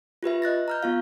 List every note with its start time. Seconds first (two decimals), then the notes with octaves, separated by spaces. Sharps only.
0.23 F4 G4 B4 E5
0.42 D#5 F#6 A6 A#6
0.68 A#5 F6 G6
0.83 B3 F4 F5